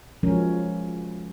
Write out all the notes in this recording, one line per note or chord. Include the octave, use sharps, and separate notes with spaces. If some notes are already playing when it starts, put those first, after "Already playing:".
F3 F#3 G#3 C#4 A#4